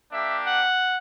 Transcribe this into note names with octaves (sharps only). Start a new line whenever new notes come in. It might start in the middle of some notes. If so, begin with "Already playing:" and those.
A#3 D4 G4 E5
F#5